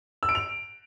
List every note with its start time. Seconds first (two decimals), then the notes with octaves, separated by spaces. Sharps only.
0.23 E6
0.29 D7
0.35 F7